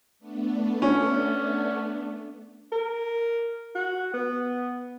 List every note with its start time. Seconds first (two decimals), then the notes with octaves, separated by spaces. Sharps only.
0.19 A3 B3 D4
0.82 C#4
2.72 A#4
3.75 F#4
4.14 B3